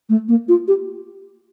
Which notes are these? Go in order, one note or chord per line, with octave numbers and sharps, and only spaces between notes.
A3
A#3
F4
G4